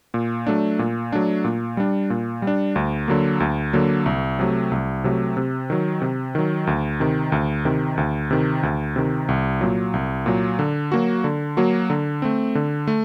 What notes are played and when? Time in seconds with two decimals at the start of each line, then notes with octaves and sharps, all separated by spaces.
0.14 A#2
0.47 F#3 A3 D4
0.79 A#2
1.12 F#3 A3 D4
1.44 A#2
1.77 G3 D4
2.10 A#2
2.42 G3
2.47 D4
2.76 D2
3.08 D3 F#3 A#3
3.40 D2
3.73 D3 F#3 A#3
4.06 C2
4.39 C3 F#3 A3
4.72 C2
5.04 C3 F#3 A3
5.37 C3
5.70 D#3 F#3
6.02 C3
6.35 D#3 F#3
6.67 D2
7.00 C3 D#3
7.32 D2
7.65 C3 D#3
7.97 D2
8.31 C3 D#3
8.63 D2
8.96 C3 D#3
9.29 C2
9.61 A#2 F#3
9.94 C2
10.26 A#2 F#3
10.59 D3
10.92 F#3 A#3 F#4
11.24 D3
11.57 F#3 A#3 F#4
11.90 D3
12.22 A3 C4
12.55 D3
12.87 A3